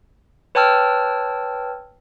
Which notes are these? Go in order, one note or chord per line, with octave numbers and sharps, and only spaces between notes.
B4 C#5 G5 A5 E6 F6